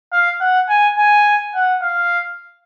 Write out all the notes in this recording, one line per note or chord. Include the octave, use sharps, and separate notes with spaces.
F5
F#5
G#5
G#5
F#5
F5